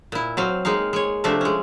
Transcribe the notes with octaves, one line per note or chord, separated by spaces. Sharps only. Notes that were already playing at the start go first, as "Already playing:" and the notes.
A#2 E4
F#3 C4 F5
G#3 A#3 D#4 F5
G#3 C#5
C3 F3 A3 D4 E5
G#3 C#4